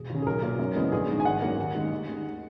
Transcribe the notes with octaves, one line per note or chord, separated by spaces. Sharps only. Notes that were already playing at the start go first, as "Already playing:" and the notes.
Already playing: E1 G#4
D#2 C#3
G#4
B1 A#4
A#2 A#3
F#2
C#3 E3 G#3 B3
A#1 G#4
G#2 D#3 G#3
G#5
G#1 F#5
F#2 D#3 F#3 A#3
D#2
D#3 G#3
D#2
D#3 G#3